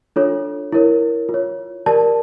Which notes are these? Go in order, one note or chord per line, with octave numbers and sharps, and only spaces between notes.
D4 F4 A4 C#5
E4 A#4 C#5
F4
C#5
G4 A#4 D5 A5